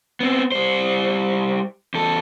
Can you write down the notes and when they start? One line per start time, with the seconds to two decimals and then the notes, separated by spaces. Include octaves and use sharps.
0.20 B3 C4
0.52 G3 C5
1.94 E2 A4